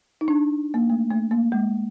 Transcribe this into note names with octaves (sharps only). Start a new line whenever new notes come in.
D#4
D4
A#3
A3
A3
A#3
G#3